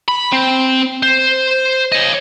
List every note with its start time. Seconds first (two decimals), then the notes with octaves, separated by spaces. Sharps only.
0.08 B5
0.32 C4
1.03 C5
1.92 C#5 D#5